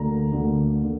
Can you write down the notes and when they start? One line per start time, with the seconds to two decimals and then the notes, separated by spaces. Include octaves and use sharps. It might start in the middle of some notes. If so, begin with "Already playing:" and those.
Already playing: D2 D3 A#3 A#5
0.32 D2 D3 A#3
0.83 D3 A#3